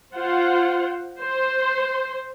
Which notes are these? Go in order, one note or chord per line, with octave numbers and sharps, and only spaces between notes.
F4 C5 F#5
C5